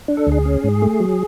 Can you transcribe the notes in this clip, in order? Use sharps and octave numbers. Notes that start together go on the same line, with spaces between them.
D4
A4
D2 G#4
C#4
G#2
A3
F#3